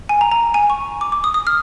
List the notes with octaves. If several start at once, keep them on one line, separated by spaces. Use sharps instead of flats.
G#5
A#5
A#5
G#5
C#6
D6
D6
D#6
D#6
F6